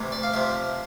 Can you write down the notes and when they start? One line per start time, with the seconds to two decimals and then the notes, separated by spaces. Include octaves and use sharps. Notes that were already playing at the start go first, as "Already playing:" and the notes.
Already playing: D2 C3 E3
0.12 D5
0.23 F5
0.33 F2 C3 F3 E5